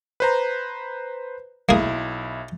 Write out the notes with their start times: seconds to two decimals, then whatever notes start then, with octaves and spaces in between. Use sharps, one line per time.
0.20 B4 C5 A#5
1.69 B1 A#3 E4 G#4